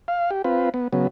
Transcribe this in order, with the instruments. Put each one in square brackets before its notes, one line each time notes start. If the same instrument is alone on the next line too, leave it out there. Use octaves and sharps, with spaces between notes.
[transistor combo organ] F5
G4
C4 F4 B4
B3
C#3 F#3 B3